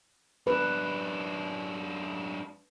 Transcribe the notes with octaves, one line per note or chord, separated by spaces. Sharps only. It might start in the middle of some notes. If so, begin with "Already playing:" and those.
F#2 D4 B4